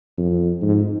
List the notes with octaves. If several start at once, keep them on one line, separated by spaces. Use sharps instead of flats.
F2
G#2